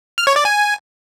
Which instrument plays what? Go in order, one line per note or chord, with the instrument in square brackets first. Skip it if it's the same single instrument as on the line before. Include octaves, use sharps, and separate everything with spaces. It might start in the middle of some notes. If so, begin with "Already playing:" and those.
[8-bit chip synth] F6
C#5
D5
G#5